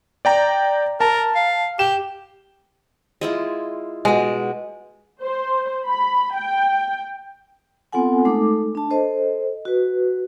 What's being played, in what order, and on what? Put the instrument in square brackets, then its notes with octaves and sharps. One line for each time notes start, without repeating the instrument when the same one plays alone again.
[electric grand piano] D5 G5 A#5
[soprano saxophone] A#4 [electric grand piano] A5
[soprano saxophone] F5
[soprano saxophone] G4 [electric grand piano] E7
[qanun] G#3 E4 F4
[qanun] B2 D6 [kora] G#3
[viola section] C5
B5
G5
[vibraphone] B3 C4 F4 A4 F#5 G#5
G#3 A3 D#4 A4 D6
D4 A5
A4 C5 D#5
F#4 B4